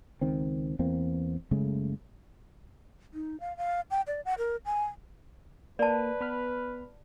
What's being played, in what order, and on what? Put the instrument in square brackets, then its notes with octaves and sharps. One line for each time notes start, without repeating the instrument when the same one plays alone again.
[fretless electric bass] C#2 D#3 C4
E2 E3 A#3 C4
F#1 C#3 G#3 A3
[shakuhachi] D#4
F5
F5
G5
D5
F#5
A#4
G#5
[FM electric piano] A#3 [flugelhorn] B4 [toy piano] D5 A5
[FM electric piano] B3 B5 F6